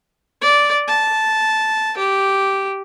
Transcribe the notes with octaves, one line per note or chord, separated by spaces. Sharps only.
D5
A5
G4